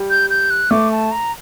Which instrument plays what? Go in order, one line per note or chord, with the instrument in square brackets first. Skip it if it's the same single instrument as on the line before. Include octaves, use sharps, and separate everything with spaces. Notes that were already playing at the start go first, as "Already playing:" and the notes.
Already playing: [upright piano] G3
[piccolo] G6
G6
F#6
[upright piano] A3 [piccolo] D6
[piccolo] A5
A#5